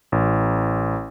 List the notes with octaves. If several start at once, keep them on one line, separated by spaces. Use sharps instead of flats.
A1